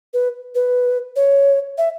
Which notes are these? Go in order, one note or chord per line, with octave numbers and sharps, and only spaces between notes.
B4
B4
C#5
E5